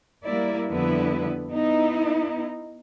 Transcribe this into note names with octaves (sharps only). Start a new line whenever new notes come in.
G3 A#3 E4 D5
F2 D3 G3 B3 E4 B4
B3 D#4 E4